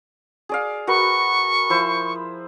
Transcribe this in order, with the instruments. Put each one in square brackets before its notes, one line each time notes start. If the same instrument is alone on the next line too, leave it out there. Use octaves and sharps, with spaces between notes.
[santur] G#4 D5 F5
[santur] F#4 A#4 B4 [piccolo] C#6
[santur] F3 E4 C5